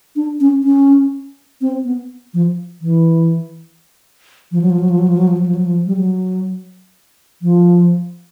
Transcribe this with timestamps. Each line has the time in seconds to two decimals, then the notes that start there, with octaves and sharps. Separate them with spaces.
0.16 D4
0.40 C#4
0.64 C#4
1.61 C4
1.85 B3
2.34 F3
2.82 E3
4.52 F3
4.62 F#3
4.70 F3
4.80 F#3
4.89 F3
4.99 F#3
5.08 F3
5.17 F#3
5.27 F3
5.37 F#3
5.46 F3
5.55 F#3
5.65 F3
5.86 G3
5.97 F#3
7.42 F3